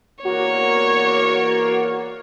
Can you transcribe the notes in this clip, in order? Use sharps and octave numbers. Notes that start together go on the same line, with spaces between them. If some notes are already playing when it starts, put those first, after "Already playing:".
E2 A#3 F#4 C#5 D5